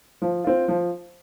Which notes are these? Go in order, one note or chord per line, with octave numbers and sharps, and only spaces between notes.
F3
C4 F4
F3